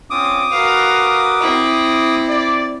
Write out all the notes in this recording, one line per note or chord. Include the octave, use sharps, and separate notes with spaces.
C4 C#4 F4 D6 D#6
F#4 A#4 B4 F5
C4 E4
D5